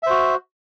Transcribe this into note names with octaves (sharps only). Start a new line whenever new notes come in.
F#4 C5 E5